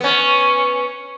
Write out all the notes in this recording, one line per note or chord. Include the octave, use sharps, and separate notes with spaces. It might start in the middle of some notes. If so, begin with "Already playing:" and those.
B3 C#4